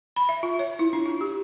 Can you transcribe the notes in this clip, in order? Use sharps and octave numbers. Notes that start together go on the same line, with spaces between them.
B5
E5
F4
C#5
E4
D4
F4
G4